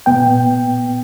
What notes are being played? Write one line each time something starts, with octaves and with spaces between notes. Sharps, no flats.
A#2 B3 G5